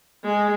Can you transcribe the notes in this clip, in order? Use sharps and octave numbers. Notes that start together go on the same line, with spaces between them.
G#3